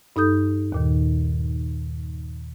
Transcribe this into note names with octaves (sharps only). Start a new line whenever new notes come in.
G2 D#4 A4 D#6 G6
D#2 A#2 D#3